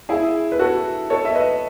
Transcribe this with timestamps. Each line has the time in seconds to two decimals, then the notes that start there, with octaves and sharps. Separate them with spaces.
0.09 E4 G#4
0.52 B4
0.59 F#4 A4
1.10 A4 C#5
1.25 E5
1.35 B4 D#5